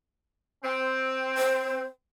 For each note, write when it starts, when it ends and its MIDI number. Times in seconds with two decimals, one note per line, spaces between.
0.63 1.82 60
1.37 1.85 72